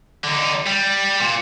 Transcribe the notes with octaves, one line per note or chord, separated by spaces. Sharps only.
D3 D#4
G3
A#2